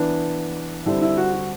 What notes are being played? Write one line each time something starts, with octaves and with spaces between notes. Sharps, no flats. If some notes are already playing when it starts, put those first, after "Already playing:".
Already playing: E3 B3 D4
D3 G3 C4 E4
E4
F#4
F#4